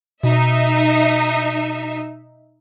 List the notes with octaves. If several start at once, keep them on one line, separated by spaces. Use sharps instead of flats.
B2 D#4 E5